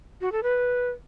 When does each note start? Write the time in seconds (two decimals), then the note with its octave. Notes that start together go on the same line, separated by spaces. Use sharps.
0.21 F#4
0.32 A4
0.43 B4